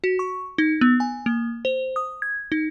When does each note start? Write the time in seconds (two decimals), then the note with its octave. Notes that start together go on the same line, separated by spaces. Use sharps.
0.04 F#4
0.19 C#6
0.58 D#4
0.81 B3
1.00 G#5
1.26 A#3
1.65 C5
1.96 D#6
2.22 G#6
2.52 D#4